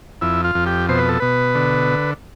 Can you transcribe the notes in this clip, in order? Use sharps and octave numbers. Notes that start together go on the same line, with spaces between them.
F2 E4
F4
F2
G4
B2 C5
B4
A4
B2 B4
D3